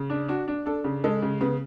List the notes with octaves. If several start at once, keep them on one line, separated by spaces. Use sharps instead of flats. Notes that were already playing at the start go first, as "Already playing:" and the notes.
Already playing: C#3
D4
D4 F#4
D4
D4 A4
C#3
G#3 A4
C#3
C#3 B3